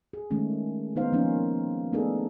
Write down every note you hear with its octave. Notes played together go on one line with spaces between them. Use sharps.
G#4
D#3 G#3 A3 C#4
D#3 B3 D#4 C5 F5
F3 A#3 C#4 D#4
A3 B3 D4 D#4 G#4 A4